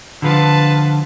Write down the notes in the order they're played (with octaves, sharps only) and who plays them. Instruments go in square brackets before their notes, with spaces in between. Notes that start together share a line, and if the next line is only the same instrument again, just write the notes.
[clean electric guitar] D3 F3 [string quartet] B4 F5 A5